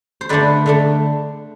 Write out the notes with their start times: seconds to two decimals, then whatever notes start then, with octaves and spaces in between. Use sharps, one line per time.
0.21 C5
0.29 D3 A3 D4 B4 D5
0.66 D3 A3 D4